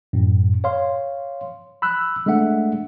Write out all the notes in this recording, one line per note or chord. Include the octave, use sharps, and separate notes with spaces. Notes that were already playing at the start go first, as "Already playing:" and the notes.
F#2 A2
C#5 F5 C6
B5 E6 F#6
G#3 A3 D4 E5 F#5